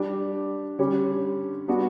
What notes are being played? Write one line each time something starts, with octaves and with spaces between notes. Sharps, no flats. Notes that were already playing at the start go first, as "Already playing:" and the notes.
Already playing: G3 D4 G4
D3 G3 C#4 G4
G3 B3 D4 F#4